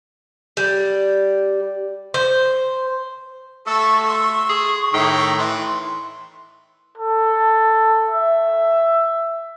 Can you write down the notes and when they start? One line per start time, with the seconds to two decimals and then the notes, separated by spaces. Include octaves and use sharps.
0.57 G3
2.14 C5
3.67 A3 A4 C#6 E6
4.08 C6 E6
4.49 G#4
4.94 A2 D#3 G5 A#5
5.38 E3 C6
6.98 A4
8.11 E5